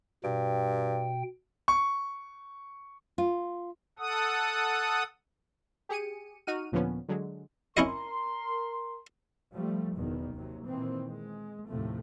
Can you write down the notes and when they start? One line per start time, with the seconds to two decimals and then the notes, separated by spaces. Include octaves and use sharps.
0.24 G2 B2 G5
1.68 C#6
3.18 F4
3.99 A4 F#5 D#6
5.89 G4 G#4 C#7 D#7
6.47 D#4 F#4 F6 D#7
6.72 D#2 A#2 D3 F3 B3 C#4
7.09 D3 F#3 G#3
7.77 C#4 E4 A#4 D#5 C6
9.52 F3 G3 A3
9.94 F#1 E2 B2 D#3
10.35 D#2 C3 F#3
10.67 A#2 D#3 E3 C4
11.09 G#3
11.68 D#2 A2 C3 F3 A3